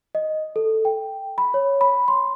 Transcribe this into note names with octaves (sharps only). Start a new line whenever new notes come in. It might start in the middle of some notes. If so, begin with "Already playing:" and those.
D#5
A4
G5
B5
C#5
B5
C6